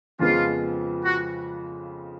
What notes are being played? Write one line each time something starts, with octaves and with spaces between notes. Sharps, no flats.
F2 C#3 F3 G#3 B3 F4
F#4